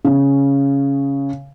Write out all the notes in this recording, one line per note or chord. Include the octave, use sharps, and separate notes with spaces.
C#3